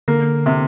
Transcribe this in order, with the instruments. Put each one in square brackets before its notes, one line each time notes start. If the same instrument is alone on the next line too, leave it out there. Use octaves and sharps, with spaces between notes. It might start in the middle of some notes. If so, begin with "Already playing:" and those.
[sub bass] D3 [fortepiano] A#3
[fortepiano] C3